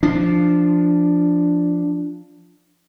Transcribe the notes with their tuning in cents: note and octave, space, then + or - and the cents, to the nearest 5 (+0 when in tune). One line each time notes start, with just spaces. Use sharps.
F3 -10 D4 +0